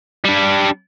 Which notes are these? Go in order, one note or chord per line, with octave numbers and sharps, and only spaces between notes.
G3 D4